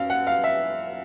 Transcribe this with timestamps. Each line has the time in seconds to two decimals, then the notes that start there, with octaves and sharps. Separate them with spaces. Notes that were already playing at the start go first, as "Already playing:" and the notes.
Already playing: F#2 F5
0.10 F#5
0.27 F5
0.44 E5